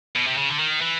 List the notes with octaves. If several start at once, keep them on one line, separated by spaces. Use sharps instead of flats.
B2
C3
C#3
D3
D#3
E3